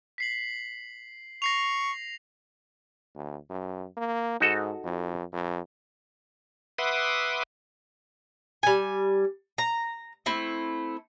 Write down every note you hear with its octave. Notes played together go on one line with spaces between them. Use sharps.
B6 C7 F#7
C#6 A#6 C7 F7
D2
F#2
A#3
G#2 D#4 F#4 A4
F2
F2
B4 E5 F#5 C6 D6 D#6
G3 G#5
A#5
A3 C4 E4